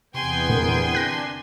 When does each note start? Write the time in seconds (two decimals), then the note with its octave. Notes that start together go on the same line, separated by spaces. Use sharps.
0.14 E2 C3 B3 G5 G#5 C6
0.49 A#2 D3 C4 A#4
0.95 D4 F#6 A#6